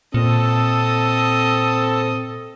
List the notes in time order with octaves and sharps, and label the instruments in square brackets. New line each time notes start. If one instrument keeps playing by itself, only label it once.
[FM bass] A#2 [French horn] C4 [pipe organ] A4 [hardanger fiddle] D#5